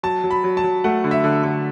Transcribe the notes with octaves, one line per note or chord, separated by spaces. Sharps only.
F#3 A5
F#3
B5
F#3
A5
F#3
A3 F#5
D3
E5
D3
D3